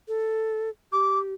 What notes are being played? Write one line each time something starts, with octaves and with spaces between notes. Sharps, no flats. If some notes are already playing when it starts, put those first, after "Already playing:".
A4
G4 D6